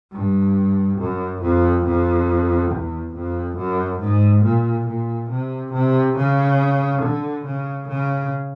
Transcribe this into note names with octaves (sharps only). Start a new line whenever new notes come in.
G2
F#2
F2
F2
E2
F2
F#2
G#2
A#2
A#2
C3
C3
C#3
D3
C#3
C#3